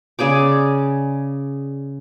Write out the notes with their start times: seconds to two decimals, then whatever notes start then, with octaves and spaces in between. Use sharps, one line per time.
0.19 C#3 G#4 D5 D6